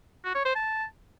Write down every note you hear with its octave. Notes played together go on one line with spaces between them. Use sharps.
F#4
C#5
C5
A5